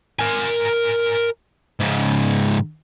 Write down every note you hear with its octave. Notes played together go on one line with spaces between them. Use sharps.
A#4 G#5
G#2 C#3